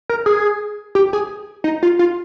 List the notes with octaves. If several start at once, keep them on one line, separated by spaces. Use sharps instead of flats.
A#4
G#4
G4
G#4
D#4
F4
F4